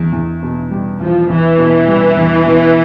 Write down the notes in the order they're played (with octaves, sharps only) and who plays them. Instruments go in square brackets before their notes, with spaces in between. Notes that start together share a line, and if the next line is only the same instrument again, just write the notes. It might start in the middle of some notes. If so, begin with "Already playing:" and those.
Already playing: [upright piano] E2
E2
B2
G3
[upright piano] E2 [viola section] F3
[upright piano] E2 [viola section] E3
[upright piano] B2
G3
E2
B2